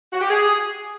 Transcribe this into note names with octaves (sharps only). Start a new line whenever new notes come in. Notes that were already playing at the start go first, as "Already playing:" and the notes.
F#4
G4
G#4